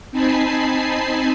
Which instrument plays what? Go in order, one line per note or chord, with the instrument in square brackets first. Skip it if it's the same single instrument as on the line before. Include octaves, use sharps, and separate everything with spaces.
[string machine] C4 D#4 G#5 A5 B5 C7